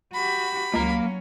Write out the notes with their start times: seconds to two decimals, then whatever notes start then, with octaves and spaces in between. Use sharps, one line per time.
0.14 F#4 G4 B5
0.74 C#2 F#3 A#3 C#4 A#5